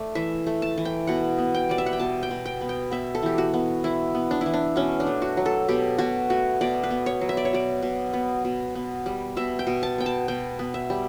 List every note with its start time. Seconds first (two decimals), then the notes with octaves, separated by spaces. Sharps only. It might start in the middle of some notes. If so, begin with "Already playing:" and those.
Already playing: A3 D5
0.15 E3 E5
0.47 A3
0.62 A5
0.78 E3
0.85 G5
1.07 B2 F#5
1.38 B3
1.55 G5
1.69 G3 D5
1.78 E5
1.86 F#5
1.93 G5
1.99 B2 A5
2.23 G5
2.31 B2
2.46 G5
2.61 B3
2.69 G5
2.92 B3 E5
3.15 A4
3.23 E3 G4
3.38 F#4
3.54 B3
3.84 E3 E4
4.15 B3
4.31 D4
4.41 E3 E4
4.54 D4
4.76 B2 C#4
5.00 D4
5.07 A3
5.22 F#4
5.37 F#3
5.46 A4
5.68 B2 G4
5.98 B2 F#4
6.30 A3 F#4
6.61 B2 D5
6.84 B4
6.90 B3
7.06 C#5
7.21 F#3
7.29 E5
7.37 D5
7.45 C#5
7.53 B2 D5
7.83 B2
8.14 B3
8.45 B2
8.75 B3
9.06 G3
9.37 B2 E5
9.59 G5
9.67 B2
9.83 A5
9.98 B3 G5
10.06 A5
10.28 B2 G5
10.59 B3
10.74 E5
10.90 G3